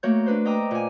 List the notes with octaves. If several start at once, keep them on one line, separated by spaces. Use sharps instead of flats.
A3 A#3 F#4 C#5 G6
D4 B4 C5
D#5 G5 A#5 D6 E6
A#2 G#5